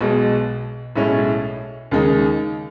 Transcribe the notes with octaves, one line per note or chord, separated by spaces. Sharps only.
B1 B2 G#3
B1 A2 G#3 C#4 E4
D#2 C#3 G#3 D#4